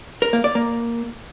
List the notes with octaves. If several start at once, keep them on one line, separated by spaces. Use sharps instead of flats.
A#4
A#3
D5
A#3